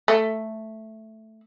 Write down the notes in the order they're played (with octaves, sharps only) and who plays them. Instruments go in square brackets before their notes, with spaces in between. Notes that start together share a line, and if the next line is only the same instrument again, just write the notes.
[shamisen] A3